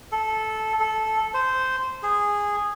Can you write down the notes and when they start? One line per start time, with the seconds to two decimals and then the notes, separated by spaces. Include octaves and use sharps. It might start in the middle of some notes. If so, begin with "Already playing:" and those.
0.12 A4
0.80 A4
1.34 C5
2.03 G#4